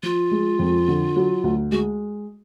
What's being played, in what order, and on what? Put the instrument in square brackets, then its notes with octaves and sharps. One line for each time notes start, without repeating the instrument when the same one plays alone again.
[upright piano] F3 [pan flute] F4
[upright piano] G#3
F2
D3
F#3
D2
[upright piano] G#3 [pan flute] F#4